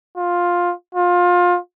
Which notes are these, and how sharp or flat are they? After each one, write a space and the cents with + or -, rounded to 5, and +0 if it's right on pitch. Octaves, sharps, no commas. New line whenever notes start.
F4 +10
F4 +25